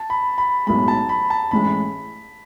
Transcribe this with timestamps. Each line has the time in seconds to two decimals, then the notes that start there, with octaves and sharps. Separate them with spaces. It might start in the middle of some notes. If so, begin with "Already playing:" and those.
Already playing: A5
0.10 B5
0.38 B5
0.67 B1 A2 G#3 B5
0.88 A5
1.09 B5
1.30 A5
1.51 A1 A2 G#3 B5